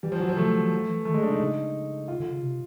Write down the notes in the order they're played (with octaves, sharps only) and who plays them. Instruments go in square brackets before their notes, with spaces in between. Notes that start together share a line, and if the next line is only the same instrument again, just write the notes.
[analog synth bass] E3 [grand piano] G3
[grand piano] F3
[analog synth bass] E3 [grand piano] F#3
[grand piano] F3
[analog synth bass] C#3 [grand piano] A3
[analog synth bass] D3
E3
F3
E3
[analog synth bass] D#3 [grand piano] A3
[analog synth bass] D3 [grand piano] G#3
[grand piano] D4
[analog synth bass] C#3
[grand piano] D#4
[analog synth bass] C#3
[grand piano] F4
[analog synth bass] D3
C#3
C3